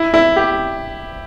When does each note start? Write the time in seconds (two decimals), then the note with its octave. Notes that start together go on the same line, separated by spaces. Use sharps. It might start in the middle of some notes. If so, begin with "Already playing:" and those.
Already playing: E4
0.14 E4
0.36 G4